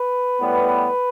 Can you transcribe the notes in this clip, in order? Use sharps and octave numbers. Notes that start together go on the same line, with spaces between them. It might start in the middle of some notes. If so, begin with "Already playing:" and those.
Already playing: B4
A2 G3 B3